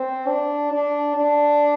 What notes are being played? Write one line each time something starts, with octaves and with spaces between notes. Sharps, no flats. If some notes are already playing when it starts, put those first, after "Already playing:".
Already playing: C4
D4
D4
D4